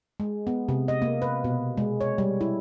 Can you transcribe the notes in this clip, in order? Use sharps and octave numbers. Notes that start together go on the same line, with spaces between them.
G#3
B3
C3
D#5
A#3
B4
B2
G#3
C#5
G3
E4